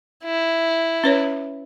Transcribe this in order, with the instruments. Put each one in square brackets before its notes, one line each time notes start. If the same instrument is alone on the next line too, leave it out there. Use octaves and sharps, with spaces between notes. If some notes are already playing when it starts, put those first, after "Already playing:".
[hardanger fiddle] E4
[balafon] C#4 B4 C#5